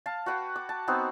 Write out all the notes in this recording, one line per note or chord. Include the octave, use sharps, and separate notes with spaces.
F5 A5
F#4 B4 F#5 G5
D6
A5
B3 C4 D#4 F#4